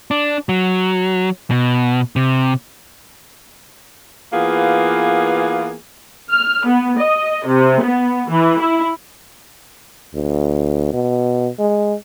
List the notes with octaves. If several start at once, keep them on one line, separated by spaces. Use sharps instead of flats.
D4
F#3
B2
C3
E3 A#3 B3 F4 G#4
F6
B3
D#5
C3
B3
E3
E4
D2
B2
G#3